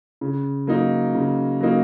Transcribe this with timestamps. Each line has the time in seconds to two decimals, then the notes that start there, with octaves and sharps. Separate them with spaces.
0.21 C#3
0.67 F#3 A#3 D#4
1.15 C#3
1.61 F#3 A#3 D#4